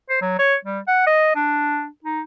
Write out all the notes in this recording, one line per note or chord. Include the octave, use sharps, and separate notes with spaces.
C5
F#3
C#5
G3
F#5
D#5
D4
D#4